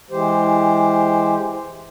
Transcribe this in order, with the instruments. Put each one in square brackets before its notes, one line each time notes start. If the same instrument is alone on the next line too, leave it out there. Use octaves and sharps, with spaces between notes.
[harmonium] E3 G#3 G4 C5